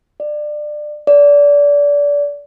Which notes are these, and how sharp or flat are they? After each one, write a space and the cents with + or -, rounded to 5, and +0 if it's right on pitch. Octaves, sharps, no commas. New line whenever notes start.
D5 +25
D5 -25